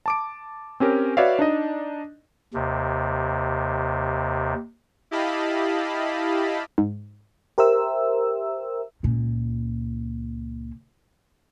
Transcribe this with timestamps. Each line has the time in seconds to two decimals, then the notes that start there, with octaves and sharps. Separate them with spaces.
0.06 A5 D6 D7
0.80 C4 C#4 G4 A#4
1.17 F#4 B4 C#5 D5 E5 F5
1.39 D4 D#4 D#5
2.54 D#2 C3
5.11 E4 G4 D#5 F5 A5 B5
6.78 G#2
7.58 G4 A#4 C5 E5 E6
9.03 C#2 A#2